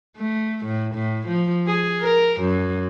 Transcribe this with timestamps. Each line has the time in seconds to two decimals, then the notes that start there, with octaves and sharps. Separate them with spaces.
0.18 A3
0.66 A2
0.95 A2
1.27 F3
1.67 G#4
2.01 A#4
2.41 F#2